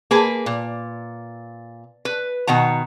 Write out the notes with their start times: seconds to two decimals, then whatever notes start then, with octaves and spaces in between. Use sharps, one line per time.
0.11 A#3 G#4 B4
0.46 A#2
2.05 B4
2.47 B2 D#3 F#5 A#5